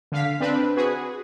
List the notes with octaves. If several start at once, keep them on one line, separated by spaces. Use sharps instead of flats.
D3 F5 B6
C4 D4 B4
F#4 G#4 B4